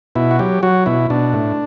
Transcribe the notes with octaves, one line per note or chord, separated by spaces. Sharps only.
B2 E4
F#4
F#3 G4
F#3 F#4
B2 E4
B2 D4
A2